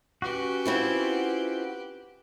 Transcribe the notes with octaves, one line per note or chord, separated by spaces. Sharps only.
C#4 F#4 G4 B4
C4 E4 F4